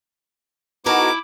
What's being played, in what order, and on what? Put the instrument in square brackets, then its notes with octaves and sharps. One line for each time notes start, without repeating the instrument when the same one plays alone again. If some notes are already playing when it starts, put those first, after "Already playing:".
[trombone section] B3 D#4 F#4 [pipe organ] E4 [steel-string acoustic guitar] A4 A#4 G#5 [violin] D6